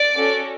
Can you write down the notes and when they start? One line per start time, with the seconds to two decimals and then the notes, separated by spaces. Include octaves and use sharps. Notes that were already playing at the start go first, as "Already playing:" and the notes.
Already playing: D5
0.17 C#4 F#4 A4